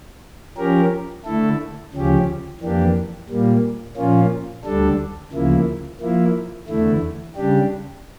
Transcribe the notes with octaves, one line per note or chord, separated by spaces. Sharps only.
F3 C#4 G4 A#4
D3 A3 E4 A4
D2 C#3 F3 C#4 G4
F2 E3 A#3 D4 G4
A#2 G3 A#3
A#2 F3 A#3 C#4 F4
D2 D3 G3 D4 A4
D2 C#3 F3 A#3 E4
F3 A#3 E4
E2 D3 A3 E4
C#3 G3 D4 G4